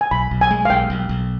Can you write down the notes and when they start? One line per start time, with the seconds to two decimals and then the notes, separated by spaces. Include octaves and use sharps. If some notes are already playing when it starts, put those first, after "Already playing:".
0.01 G#5
0.11 B1 B5
0.31 B1
0.41 G#5
0.51 G#3
0.65 F5
0.70 B1 G5
0.90 B1
1.09 B1